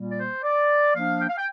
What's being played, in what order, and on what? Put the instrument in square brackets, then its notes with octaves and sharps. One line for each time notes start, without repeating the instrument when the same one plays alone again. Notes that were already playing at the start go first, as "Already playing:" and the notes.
Already playing: [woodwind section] A#2 G3 A#3
D5
C5
D5
F3 A#3 D4 F5
G5
F5
G5